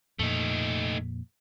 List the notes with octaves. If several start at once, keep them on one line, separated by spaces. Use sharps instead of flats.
F2 A#2 A3 D#4